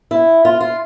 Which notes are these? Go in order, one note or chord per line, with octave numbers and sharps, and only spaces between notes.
E4
F4
F4